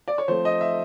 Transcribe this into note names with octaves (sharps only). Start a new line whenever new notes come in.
D5
C#5
F3 A3 C4 C5
D#5
E5